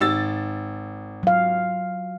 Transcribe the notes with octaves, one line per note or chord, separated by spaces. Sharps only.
G#1 E6 A6
F#3 F5